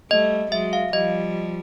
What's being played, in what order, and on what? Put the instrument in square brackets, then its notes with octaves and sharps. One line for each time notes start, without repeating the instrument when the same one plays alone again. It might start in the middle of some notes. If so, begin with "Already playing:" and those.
[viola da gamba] G3 A3 [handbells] D#5
[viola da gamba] F#3 G#3 [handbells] E5
[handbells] F5
[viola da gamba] F3 G3 [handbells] D#5